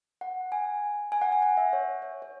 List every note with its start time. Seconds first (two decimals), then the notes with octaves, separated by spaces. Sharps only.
0.21 F#5
0.52 G#5
1.12 G#5
1.22 F#5
1.32 G#5
1.42 F#5
1.57 E5
1.73 C#5
2.02 C#5
2.22 C#5